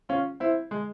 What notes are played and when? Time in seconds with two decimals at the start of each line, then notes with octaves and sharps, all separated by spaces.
0.09 C#4 F4
0.40 C4 E4
0.71 G#3